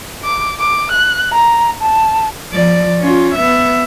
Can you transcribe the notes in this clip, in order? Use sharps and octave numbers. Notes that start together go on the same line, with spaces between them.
D6
D6
F#6
A#5
A5
F3 D5
C#4 F4
B3 E5